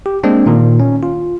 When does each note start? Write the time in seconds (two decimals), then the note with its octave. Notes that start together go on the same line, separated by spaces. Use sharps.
0.06 G4
0.24 G#3 A#3 C4 D4
0.46 A#2 D#3
0.80 C#4
1.03 F4